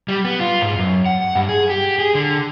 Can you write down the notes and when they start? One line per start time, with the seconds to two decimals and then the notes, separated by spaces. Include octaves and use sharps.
0.08 G3
0.25 B3
0.40 F4
0.62 G#2
0.78 F#2
1.06 F#5
1.35 G2
1.49 G#4
1.70 G4
1.99 G#4
2.15 D3